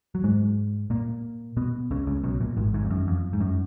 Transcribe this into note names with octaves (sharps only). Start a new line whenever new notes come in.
F#3
G#2 G#3
A#2 A#3
B2 B3
C#2 C#3
C#2 C#3
B1 B2
A#1 A#2
G#1 G#2
G#1 G#2
F2
F#2
F2
G#2
F#2